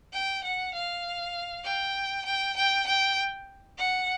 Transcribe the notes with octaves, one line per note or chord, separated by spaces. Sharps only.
G5
F#5
F5
G5
G5
G5
G5
F#5